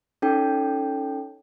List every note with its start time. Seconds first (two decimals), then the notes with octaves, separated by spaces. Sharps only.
0.22 C#4 D#4 A4 G5